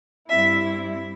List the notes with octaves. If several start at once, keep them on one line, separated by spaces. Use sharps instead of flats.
G2 G3 C4 E4 E5